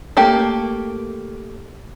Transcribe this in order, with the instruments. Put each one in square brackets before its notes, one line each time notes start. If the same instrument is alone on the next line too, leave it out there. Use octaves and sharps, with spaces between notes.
[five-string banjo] A3 A#3 G4